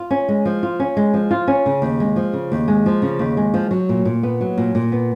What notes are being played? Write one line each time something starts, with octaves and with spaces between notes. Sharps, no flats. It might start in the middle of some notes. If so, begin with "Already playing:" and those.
Already playing: F4
C#4
G#3
F3
F4
C#4
G#3
F3
F4
C#4
C#3
D#2
G#3
F3
C#3
D#2
G#3
F3
C#3
D#2
G#3
F3
F#3
A#2
A#2
B3
F#3
A#2
A#2
B3